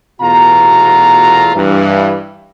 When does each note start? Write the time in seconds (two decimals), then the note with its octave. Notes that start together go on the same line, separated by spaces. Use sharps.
0.21 E2 B2 A3 F4 F#4 A#5
1.55 G2 E3